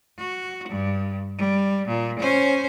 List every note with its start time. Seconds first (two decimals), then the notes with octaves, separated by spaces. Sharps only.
0.18 F#4
0.69 G2
1.38 G3
1.88 A#2
2.19 C#4 C5